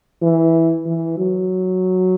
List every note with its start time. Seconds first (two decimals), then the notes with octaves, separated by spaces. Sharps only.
0.22 E3
0.86 E3
1.18 F#3